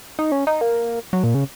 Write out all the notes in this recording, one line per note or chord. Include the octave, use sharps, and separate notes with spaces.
D#4
C#4
D#4
A#3
F#3
A#2
C#3